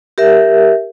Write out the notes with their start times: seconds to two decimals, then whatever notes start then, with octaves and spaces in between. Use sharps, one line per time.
0.18 G4 A#4 E5